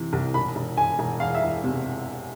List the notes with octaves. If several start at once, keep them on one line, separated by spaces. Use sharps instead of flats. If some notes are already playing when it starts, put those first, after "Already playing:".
Already playing: C3 E3
C2
E1 B5
E1
E1 G#5
E1
E2 F5
E5
E1
C3